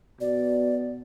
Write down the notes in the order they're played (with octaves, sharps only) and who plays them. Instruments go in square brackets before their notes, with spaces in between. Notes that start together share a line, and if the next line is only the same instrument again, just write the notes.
[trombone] B2 [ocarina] D5